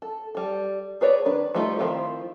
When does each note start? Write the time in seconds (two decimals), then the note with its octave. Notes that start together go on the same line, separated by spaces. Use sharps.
0.02 A4
0.35 G3 A4
1.01 G#4 B4 C#5 D5
1.25 D#3 D4 B4
1.54 F3 G3 A3 D#4 F4
1.79 D#3 F3 C4 E4 F4